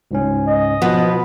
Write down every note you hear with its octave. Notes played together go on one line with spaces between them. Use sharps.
C#2 G#2 C#4
D#5
B2 F3 B3 B4